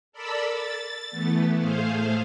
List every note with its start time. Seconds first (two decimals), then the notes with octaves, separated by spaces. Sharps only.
0.12 A4 A#4 D5 B5 E6
0.49 A6
1.10 E3 A3 B3
1.58 A2 A3 G#4 C5 F5